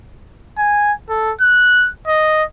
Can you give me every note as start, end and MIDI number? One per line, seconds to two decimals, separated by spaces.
0.58 0.92 80
1.09 1.32 69
1.41 1.90 90
2.08 2.43 75